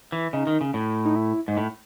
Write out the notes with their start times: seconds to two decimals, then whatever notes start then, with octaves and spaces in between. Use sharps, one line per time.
0.12 E3
0.33 C#3 D#4
0.47 D#3
0.61 C#3
0.74 A2
1.05 D#4
1.16 E4
1.48 G#2
1.57 A2